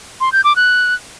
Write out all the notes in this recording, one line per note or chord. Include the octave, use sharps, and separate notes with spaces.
C6
G6
D6
F#6